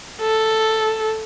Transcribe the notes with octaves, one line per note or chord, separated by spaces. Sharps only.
A4